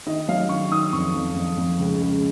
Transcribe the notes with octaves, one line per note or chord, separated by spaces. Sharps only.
D#3 D#5
F#3 F5
D#3 C#6
D#3 D#6
F2 C#6
F2
F2
F2
C#2
C#2